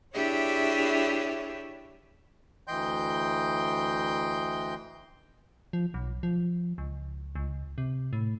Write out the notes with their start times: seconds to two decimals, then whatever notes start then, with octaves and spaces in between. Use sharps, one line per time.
0.15 D4 E4 G4 G#4 C#5 E5
2.67 D2 E3 D#5 G5 C6 G6
5.73 F3
5.94 B1
6.23 F3
6.78 C#2
7.35 C#2
7.78 C3
8.13 A2